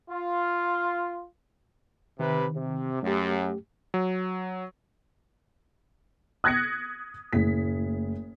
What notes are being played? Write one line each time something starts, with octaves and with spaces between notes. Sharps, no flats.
F4
C3 D#3 B4
C3
F#2 A3 G4
F#3
D#6 F#6 G#6 A#6 B6 C#7
F#1 A2 B6